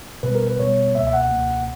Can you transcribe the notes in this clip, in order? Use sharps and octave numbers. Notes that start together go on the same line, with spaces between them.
B2 G3 B3 B4
A#4
B4
B2 G3 B3 C#5
C#2 B2 A#3 E5
E5
F#5
C#2 B2 A#3